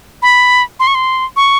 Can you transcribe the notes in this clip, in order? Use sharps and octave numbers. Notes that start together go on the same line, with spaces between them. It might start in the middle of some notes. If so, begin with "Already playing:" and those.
B5
C6
C#6
C6
C#6